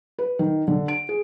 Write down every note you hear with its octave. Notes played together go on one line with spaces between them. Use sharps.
B4
D#3
D3
D7
G#4